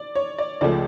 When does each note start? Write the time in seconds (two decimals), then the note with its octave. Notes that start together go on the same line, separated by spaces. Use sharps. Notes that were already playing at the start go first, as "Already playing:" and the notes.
Already playing: D5
0.15 C#5
0.38 D5
0.61 C#2 C#3 F3 A3 D5